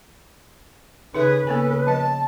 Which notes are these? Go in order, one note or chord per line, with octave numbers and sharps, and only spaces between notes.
C#3 D#4 G#4 A4 B4 E5
C#3 A#3 B3 A4 G#5
F3 D#5 A5